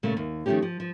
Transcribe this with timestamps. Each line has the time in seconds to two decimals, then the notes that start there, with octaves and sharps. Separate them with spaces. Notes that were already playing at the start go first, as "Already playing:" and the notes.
0.03 A#2 C#3 A3
0.17 D#2
0.46 D#3 F3 F#3 A3 C#4 G4
0.62 F3
0.80 F3